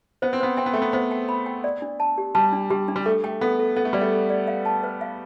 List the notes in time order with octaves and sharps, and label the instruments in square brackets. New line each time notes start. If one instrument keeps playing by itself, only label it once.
[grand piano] B3 [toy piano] C5
[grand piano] C4
[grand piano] B3 [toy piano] C5
[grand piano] C4 [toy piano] G5
[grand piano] B3
[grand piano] A3 [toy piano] G5
[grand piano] B3
[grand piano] B3 [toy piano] C5
[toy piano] G5
B5
G5
D5
D4
A5
G4
[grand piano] G3 [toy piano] A5
[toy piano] D4
[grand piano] G3 [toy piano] G4
[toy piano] D4
[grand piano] G3
[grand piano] A3 [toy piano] A4
[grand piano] A3 [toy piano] G5
[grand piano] B3 [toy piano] A4
[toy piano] A4
[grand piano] B3 [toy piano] A4
[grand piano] A3
[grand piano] G3 [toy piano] D5
[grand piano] A3
[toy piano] A4
D5
F5
A5
B4
F5